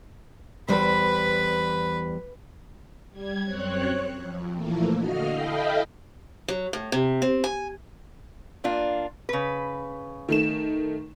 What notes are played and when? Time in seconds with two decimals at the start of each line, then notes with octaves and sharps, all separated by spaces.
0.68 E2 G3 B4 C5 B5
3.10 G3 G#6
3.43 F#2 C4 C#5 F#6
4.10 F2
4.53 A#2 E3 F3 A3 A#3
4.96 D3 F#4 D#5 F5 F6
5.31 E4 A4 D#5 F5 G5 B5
6.48 F#3
6.73 A2
6.92 C3
7.22 C4
7.44 G#5
8.64 A#3 D4 F4
9.29 C#3 B4
10.29 D#3 A3 E7